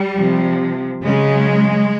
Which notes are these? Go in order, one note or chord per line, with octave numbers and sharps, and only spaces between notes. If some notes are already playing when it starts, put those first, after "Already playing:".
Already playing: G3
C3 F3
C#3 F#3 G#3